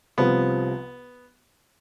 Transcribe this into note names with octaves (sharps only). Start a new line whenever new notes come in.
C2 C3 F3 B3 C4 F4